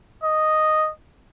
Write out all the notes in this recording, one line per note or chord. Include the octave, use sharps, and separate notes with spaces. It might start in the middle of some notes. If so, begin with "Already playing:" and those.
D#5